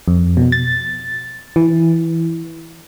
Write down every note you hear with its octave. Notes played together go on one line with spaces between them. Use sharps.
F2
B2
A6
E3